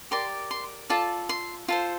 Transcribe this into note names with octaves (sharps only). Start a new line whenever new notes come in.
G4 A#4 D5 C6
C6
F4 A4 D5 A5
C6
F4 A4 C5